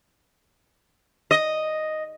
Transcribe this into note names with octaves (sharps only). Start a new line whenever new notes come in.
D#5